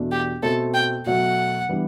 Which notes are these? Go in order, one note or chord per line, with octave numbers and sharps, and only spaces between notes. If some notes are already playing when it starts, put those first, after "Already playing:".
Already playing: E2 B2 A3 D4
G4
B2 A3 C4 A4
G5
B2 F#3 A3 F#5
E3 G3 B3 D4